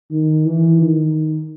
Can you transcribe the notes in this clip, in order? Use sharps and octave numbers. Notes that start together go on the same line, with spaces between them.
D#3
E3
D#3